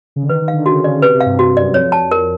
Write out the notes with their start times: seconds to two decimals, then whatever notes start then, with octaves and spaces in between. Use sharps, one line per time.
0.16 C#3
0.23 D3
0.29 D#3 B4
0.42 D#3
0.48 F5
0.53 D3
0.66 C#3 F#4
0.84 C#3 D5
1.02 C3 B4
1.14 C3
1.20 F5
1.26 G2
1.39 G2 F#4
1.57 F#2 D5
1.74 F2 C#5
1.92 A5
2.11 A#4